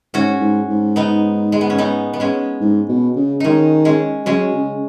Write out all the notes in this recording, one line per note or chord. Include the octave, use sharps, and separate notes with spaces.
G#2 C#4 F#4
G#2
G#2
B3 D#4
G#3
B3
C#4
B3 D#4
B3
G#3 C#4
G#2
B2
C#3
D#3 G#3 C#4 D#4
G#3 C#4
F#3 G#3 C#4
C#3